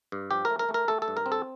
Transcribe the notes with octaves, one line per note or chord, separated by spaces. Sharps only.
G2
F3 G4
A3 A#4
A#4
A3
A#4
A3 A4
A4
G2
A#4
C4
A4